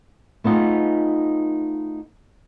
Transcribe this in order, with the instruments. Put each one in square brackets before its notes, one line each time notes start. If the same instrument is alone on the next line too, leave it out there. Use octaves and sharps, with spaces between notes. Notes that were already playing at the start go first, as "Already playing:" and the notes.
[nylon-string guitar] A3 B3 D#4 F4 G#4